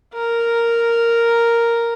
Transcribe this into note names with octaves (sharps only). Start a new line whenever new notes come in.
A#4